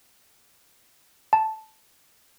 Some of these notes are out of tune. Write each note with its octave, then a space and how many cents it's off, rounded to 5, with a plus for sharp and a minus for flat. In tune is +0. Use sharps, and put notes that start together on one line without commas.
A5 -5